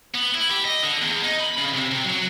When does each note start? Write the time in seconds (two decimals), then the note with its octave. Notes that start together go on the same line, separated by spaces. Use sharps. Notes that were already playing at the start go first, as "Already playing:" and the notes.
0.15 B3
0.35 E4
0.51 G4
0.65 D#5
0.83 D3
1.02 E2
1.23 D#4
1.40 B5
1.58 C#3
1.73 C3
1.91 C3
2.04 F#3